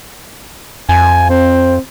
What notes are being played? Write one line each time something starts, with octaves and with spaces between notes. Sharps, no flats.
F2 G#5
C4